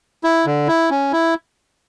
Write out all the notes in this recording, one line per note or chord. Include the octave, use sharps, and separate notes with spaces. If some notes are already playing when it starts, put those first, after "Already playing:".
E4
D3
E4
C#4
E4